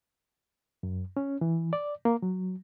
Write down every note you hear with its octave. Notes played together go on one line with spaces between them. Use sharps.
F#2
C#4
E3
D5
A#3
F#3